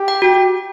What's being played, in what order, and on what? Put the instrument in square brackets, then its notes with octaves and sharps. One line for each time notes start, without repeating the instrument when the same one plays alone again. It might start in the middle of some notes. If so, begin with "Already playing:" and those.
Already playing: [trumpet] G4
[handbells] G5
F#4